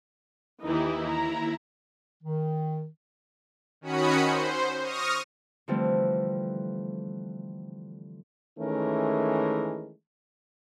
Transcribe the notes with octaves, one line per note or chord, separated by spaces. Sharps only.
D#2 E3 D#4 E4 G4
A#5
D#3
D#3 C#4 F#4 B5 D#6 C#7
C5
C#6 D#6 F6 A#6
D3 E3 F3 G3 A3 C4
D#3 E3 G#3 A3 C#4 A#4